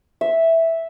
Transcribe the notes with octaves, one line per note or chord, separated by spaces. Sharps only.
E5